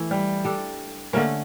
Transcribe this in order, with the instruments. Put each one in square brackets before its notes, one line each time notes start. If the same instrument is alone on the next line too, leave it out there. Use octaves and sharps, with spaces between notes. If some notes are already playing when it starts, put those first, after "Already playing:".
Already playing: [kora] E3 A3 E4
[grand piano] G3
[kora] G3 D4 A4
[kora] D3 A3 C#4 [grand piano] A#3